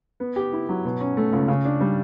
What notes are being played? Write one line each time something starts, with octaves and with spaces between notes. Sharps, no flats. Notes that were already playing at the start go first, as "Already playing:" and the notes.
B3
G4
E4
F#3
B2
C#4
A3
C#2
C#3
D4
G3